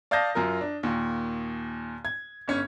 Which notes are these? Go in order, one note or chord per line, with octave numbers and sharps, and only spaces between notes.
D5 F5 A5 D#6 G6 A#6
F#2 F4 A#4
D4
D#2 A#2
G#6
G1 C#4 G#6